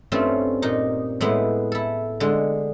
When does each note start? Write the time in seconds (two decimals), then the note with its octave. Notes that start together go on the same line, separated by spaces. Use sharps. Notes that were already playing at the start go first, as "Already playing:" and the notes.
0.12 G2 A3 C4 C#4 F4
0.62 A#2 D#4
1.21 A2 G#3 B3 E4
1.72 E4 A4
2.20 D3 G#3